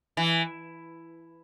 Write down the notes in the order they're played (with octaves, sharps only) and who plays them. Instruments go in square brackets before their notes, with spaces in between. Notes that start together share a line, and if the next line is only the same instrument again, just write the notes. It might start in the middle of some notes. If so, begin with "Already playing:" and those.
[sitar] E3